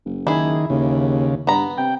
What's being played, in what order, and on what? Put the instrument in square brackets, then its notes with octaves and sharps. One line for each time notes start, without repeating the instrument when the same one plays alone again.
[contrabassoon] F#1
[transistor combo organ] D#3 [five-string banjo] E4 G#4
[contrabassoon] D#2 [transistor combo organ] C#3
[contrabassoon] G2 [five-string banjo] B3 A#5
[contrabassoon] C3 [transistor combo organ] G5